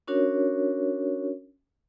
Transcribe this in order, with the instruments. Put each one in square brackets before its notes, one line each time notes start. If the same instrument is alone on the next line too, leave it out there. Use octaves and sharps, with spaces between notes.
[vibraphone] C#4 D4 F#4 A#4 C#5